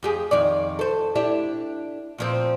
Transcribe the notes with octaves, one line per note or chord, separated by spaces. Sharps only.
F2 G4 G#4
F2 D#3 D5
A4 C5
D4 E4 G4
A#2 F3 C4